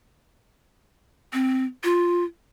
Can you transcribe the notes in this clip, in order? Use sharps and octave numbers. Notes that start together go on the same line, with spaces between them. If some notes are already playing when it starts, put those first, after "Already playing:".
C4
F4